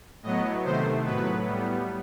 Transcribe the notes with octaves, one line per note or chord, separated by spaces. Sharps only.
A2 F#3 B3 D#5
C3 D#3 A3 C5
A2 F#3 B3 B4
A2 G3 B3